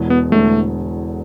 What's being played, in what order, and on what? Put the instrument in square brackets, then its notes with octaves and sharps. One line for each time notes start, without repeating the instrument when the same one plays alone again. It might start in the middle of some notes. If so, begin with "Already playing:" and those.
Already playing: [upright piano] E1 E2 B2
[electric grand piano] B3
[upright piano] E1 E2 D3 [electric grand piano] A3